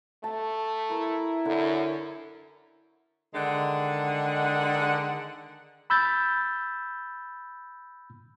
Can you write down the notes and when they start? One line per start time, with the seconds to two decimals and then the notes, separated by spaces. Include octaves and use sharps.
0.24 A3 A5
0.91 E4 A#4
1.45 F#2 D3
3.34 D3 D#3 G#3 F#5
5.90 B5 E6 G6 A6